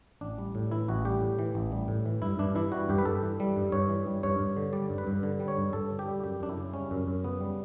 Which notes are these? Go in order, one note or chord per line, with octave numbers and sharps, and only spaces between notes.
A1 D4
G3
A2
E3 E4
A1 F#4
G3 G4
A2
E3
A1
G3
A2
E3
G2 E4
G2 D4
E3 E4
G3 F#4
G2 G4
B4
G2 A4
E3
G3
G2
G2 C#5
E3
G3
G2 C#5
G2
D3
G3 D5
G2
B4
G2
D3
G3
C#5
G2
G2 A4
D3
G4
G3
F#2 G4
F#2 D4
E4
C#3
G3 C#4
F#2
F#2
C#3 B3
G3